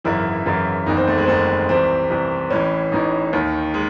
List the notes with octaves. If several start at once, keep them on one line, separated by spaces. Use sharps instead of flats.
G#1 F#2 C#3 E3 E4
G#1 F#2 C#3 E3
F#1 E2 D#3 D#4
C4
A3
G#3
C4
F#1 E2 D#3 A3
C2 C3 E3 C4
C2 C3 E3
A1 A2 E3 C#4
A1 A2 E3 D#4
D#2 D#3
G#3